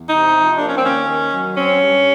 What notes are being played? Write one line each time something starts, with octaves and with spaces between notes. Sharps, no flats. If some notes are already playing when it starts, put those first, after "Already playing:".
Already playing: E2
C3 D#4
F3
A#3 D4
C#4
C4
D#2 C#4
D#3
F#3
C4 C#4
G2